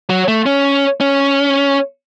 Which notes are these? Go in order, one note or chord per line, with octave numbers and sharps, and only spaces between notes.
F#3
A3
C#4
C#4